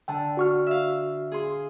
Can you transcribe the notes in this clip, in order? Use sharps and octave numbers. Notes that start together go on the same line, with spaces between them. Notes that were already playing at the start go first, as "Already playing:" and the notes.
D3 G5 A5
F#4 C#6 F6
E5 F5
G#4 C6